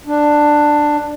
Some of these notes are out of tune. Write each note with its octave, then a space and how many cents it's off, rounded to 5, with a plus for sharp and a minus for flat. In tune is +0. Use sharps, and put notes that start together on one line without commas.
D4 +10